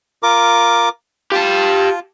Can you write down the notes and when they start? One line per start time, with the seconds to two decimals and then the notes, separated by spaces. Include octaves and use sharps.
0.23 F4 A#4 D6
1.32 F4 G4 A5